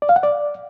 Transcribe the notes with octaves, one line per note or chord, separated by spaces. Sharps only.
D5
F5
F#5
D5